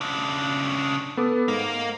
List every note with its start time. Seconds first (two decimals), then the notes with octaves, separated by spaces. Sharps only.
0.01 C#3 D4
1.17 B3 A4 D6
1.48 G#2 A#3